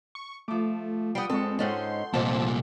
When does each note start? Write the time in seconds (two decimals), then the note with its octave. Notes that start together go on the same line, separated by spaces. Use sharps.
0.15 C#6
0.48 F3 A3 D6
1.15 G3 B4 F#5 G5 D#6
1.30 F2 G#3 C4 A4 C#6
1.59 G#2 C#4 D#4 A4 F#5 G5 C6
2.14 C2 F2 A#2 F3 A5